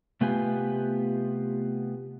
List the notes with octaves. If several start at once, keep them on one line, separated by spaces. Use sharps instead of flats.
C3 A3 B3 F4 G4 G#5